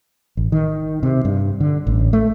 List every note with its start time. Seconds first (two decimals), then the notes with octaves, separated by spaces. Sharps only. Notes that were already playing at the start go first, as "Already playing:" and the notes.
0.37 A1
0.52 D#3
1.03 C3
1.25 G2
1.60 D3
1.87 A1
2.13 A3